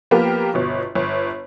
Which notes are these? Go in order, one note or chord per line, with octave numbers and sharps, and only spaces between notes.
F3 A#3 B3 G4 A#4 B4
G1 B2
G1